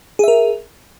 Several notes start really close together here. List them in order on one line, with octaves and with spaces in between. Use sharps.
G#4 E5 A#4